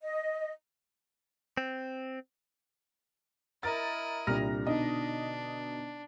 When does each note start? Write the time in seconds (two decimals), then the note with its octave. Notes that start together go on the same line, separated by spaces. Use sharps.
0.02 D#5
1.57 C4
3.63 E4 A#4 D#5 A6
4.27 C2 A#2 D3 A#5 F6 A#6
4.67 B2 D3 D4 D#4 D#5